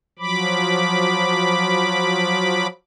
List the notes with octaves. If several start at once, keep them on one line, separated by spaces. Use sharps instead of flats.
F3 F#3 B5 D6